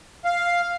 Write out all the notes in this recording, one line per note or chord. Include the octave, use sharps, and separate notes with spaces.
F5